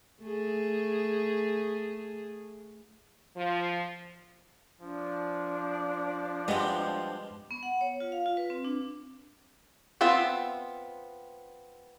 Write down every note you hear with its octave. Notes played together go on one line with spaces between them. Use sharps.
A3 G#4
F3
F3 D4
B2 G3 G#3 C4
B3
F#5
C#5
F4
F5
F4
B4
C4
D4
B3 C4 F4 E5